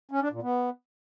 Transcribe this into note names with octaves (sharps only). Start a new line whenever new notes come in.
C#4
D4
A#2
B3